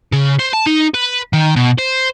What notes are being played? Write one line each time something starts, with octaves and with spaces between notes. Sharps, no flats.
C#3
C5
A5
D#4
B4
D#3
B2
C5